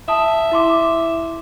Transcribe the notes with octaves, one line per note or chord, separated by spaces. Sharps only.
E5 A5 D#6
E4 C6 D6